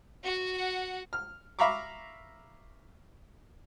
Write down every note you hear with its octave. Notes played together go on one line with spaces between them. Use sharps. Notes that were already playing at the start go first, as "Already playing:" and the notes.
F#4 F#5
F6
E5 F5 A#5 B5 C#6 D6